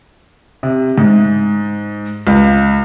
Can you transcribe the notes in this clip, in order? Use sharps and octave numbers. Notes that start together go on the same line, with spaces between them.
C3
G#2
C#2